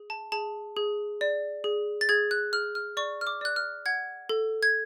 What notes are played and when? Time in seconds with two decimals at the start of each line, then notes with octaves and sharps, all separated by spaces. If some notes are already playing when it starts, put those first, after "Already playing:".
Already playing: G#4
0.10 A5
0.32 G#4 A5
0.76 G#4
1.21 D5
1.64 G#4
2.01 A6
2.09 G#4 G#6
2.31 F#6
2.53 G#4 F6
2.75 F6
2.97 D5 C#6
3.21 F6
3.27 D6
3.41 D5 F#6
3.56 F6
3.86 F#5 G#6
4.29 A4
4.63 G#6